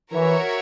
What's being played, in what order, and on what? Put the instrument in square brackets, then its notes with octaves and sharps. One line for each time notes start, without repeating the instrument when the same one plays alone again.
[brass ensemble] E3 [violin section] F#4 A#4 C#5 E5